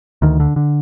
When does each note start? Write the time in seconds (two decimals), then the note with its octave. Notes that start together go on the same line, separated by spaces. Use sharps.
0.22 D2 D#3
0.40 D3
0.56 D3